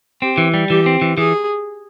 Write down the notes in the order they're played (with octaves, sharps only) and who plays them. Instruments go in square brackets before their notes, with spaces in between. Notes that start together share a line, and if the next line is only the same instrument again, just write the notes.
[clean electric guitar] C4 [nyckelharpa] G4
[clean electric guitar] E3
G3
[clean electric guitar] E3 [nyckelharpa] G4
[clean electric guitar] C4
E3
[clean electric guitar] E3 [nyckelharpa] G#4